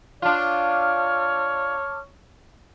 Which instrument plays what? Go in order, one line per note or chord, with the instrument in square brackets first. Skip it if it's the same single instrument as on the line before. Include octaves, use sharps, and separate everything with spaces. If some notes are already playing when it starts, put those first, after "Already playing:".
[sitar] D4 F4 [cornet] C#5 [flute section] A5 D6 F6